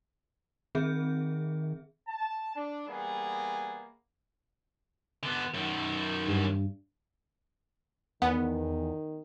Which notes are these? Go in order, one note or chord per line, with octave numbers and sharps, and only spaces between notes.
D#3 C4 G#4 E5
A5
D4
E3 G3 A#3 B3 G#4
D3 B3
F#2 D#3
G2
E2 D#3 B3 F#5